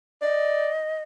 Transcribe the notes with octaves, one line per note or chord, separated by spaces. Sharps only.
D5 D#5